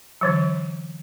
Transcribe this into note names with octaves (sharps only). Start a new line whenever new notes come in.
D3 E3 F#3